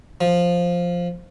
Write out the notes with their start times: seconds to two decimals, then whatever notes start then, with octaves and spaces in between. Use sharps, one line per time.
0.21 F3